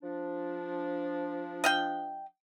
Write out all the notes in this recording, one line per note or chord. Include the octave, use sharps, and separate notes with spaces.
F3 D4
D#5 F5 G5